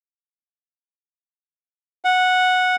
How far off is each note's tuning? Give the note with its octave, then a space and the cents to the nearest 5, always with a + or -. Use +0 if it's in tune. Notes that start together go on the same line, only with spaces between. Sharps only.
F#5 -10